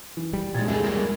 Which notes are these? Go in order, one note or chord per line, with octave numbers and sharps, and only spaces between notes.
E3
G3
A#2 G#3 G#6 A6
F1 C#2 A3 G#4
A#3 E4 A#4